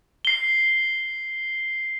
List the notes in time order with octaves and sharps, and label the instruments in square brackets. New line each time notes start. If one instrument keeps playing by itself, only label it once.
[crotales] C7 G7